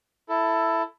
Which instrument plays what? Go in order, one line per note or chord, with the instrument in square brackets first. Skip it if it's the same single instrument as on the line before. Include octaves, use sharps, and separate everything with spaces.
[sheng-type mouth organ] E4 A4